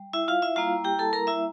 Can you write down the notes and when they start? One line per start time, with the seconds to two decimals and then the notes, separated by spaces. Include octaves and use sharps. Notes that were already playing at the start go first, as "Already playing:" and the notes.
Already playing: G3
0.13 E4 E5
0.28 F4 F5
0.42 E4 E5
0.56 G3 A#3 E4 F4 F5
0.84 G4 G5
0.99 A4 A5
1.13 A#4 A#5
1.27 E4 E5